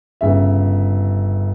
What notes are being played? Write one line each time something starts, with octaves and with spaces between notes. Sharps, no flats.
G1 C#3 E5